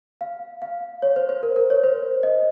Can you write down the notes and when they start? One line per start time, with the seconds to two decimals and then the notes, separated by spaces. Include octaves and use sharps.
0.21 F5
0.62 F5
1.02 C#5
1.16 C5
1.29 C5
1.43 A#4
1.56 A#4
1.70 C#5
1.84 C5
2.23 D#5